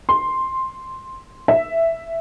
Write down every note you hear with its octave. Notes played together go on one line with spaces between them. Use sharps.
C6
E5